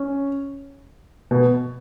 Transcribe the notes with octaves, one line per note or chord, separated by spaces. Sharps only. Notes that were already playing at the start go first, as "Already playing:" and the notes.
Already playing: C#4
B2